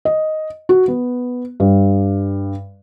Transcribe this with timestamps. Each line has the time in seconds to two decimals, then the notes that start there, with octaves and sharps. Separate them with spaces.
0.05 D#5
0.69 F#4
0.88 B3
1.60 G2